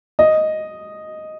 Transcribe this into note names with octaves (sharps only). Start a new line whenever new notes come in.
D#5